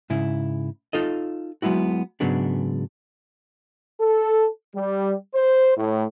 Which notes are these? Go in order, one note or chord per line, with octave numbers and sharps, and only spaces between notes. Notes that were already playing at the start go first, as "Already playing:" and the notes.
G#2 C#3 E4
D#4 F4 A4 D#5
F#3 G#3 B3 E4 F#4
G#2 C#3 F#3 G#3 B3 D4
A4
G3
C5
A2